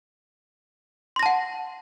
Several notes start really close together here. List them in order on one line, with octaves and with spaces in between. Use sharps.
C6 A#6 A5 F#5